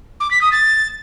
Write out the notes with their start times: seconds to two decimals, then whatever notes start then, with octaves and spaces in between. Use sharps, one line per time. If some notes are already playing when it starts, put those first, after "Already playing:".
0.20 D6
0.31 B6
0.41 D#6
0.52 A6